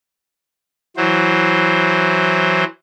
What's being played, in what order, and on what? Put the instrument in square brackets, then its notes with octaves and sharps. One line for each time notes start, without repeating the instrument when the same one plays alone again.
[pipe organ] E3 F#3 C5